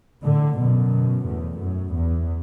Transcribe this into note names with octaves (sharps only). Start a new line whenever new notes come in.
A2 D3
F#2 B2
E2 A2
F#2
E2